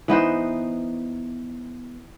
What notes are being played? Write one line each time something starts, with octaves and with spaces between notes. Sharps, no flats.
E3 B3 D#4 C5